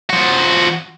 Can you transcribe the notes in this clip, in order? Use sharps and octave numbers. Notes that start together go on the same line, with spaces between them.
F3 F#4